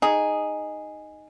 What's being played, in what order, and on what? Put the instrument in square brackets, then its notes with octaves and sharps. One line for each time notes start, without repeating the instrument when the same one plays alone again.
[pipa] D#4 G#4